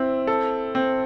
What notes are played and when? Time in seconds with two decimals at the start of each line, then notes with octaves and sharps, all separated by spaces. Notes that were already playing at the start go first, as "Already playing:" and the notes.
Already playing: C4 E4
0.27 A4
0.75 C4